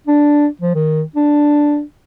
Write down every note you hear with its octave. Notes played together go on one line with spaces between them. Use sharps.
D4
F3
D#3
D4